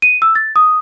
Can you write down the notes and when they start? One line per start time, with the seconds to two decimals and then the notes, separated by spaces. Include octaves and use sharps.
0.02 D#7
0.22 E6
0.35 A6
0.56 D#6